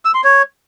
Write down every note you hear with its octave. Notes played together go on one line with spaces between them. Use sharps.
E6
C6
C#5